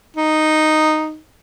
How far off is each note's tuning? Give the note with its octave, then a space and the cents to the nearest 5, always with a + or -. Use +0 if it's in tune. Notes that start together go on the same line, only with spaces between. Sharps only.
D#4 -5